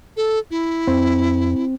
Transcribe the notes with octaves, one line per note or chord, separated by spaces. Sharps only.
A4
E4
F2 C4